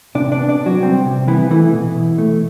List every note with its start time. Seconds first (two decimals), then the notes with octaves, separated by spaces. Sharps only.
0.15 C3 D4 D5
0.32 D4 D5
0.38 B3
0.49 D4 D5
0.60 C3
0.66 F#3 F#4
0.83 G3 C4
1.05 C3
1.28 E3 B3 E4
1.51 E3 A3 E4
1.73 B2
1.95 B2
2.18 A3